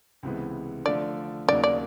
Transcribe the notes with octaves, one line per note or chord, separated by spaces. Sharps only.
C#2 C3 E3 G#3 B3
D3 F3 A3 D4 F4 D5
D#2 C#3 F#3 A#3 D#4 D5
D5